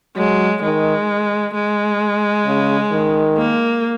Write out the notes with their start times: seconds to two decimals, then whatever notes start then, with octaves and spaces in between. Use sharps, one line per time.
0.17 F#3 G#3
0.63 D#3 G#3
1.54 G#3
2.46 C#3
2.92 D#3
3.37 A#3